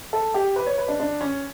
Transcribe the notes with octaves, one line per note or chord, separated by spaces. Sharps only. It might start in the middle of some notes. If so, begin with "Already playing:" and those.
A4
G4
B4
C#5
B4
D4
D4
C#4